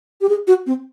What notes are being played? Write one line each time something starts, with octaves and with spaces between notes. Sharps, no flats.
G4
G#4
F#4
C4